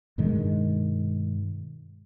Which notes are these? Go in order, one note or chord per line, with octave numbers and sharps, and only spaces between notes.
G2 B2 D#3 G#3